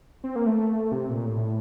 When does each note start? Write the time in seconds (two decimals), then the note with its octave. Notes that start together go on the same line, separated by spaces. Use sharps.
0.24 C4
0.36 A#3
0.46 A3
0.92 C3
1.09 A#2
1.25 A2